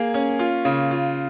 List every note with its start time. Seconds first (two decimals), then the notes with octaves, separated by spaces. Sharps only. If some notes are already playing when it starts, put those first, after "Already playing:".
Already playing: A#3 G#4
0.14 C#4
0.39 F4
0.65 C#3
0.91 F4